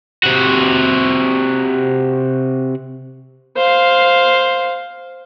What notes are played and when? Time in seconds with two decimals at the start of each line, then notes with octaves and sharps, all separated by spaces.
0.24 C3 F#4
3.57 C5 F5